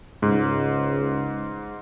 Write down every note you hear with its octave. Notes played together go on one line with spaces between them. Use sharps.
C#2 G#2